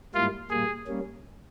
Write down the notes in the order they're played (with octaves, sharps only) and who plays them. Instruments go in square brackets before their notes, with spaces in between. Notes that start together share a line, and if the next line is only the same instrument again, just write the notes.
[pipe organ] G#2 G3 A#3 E4 [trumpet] F4
[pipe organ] A#2 G3 A#3 [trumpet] G#4
[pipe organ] G3 A#3 C#4